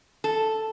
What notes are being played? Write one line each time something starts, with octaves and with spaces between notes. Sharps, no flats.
A4